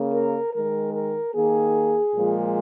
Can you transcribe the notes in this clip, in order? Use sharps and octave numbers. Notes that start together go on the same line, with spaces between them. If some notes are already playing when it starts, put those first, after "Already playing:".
Already playing: C#3 A#3
A#4
D#3 G#3 A#4
A#4
D#3 A#3 G#4
A#2 F3 G#3